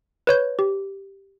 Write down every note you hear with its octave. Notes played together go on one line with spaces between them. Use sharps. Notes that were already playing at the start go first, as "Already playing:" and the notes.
B4 C#5 G6
G4